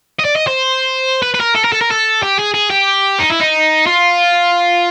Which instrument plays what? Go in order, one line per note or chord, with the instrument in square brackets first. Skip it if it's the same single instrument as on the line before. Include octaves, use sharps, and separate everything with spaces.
[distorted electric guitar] D#5
D5
D#5
C5
B4
B4
A#4
A4
A#4
A4
A#4
A4
G4
G#4
G#4
G4
D#4
E4
D#4
F4